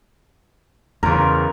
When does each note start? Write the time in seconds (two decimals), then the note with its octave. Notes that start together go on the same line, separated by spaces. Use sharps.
1.03 E2 C#3 F4 A#4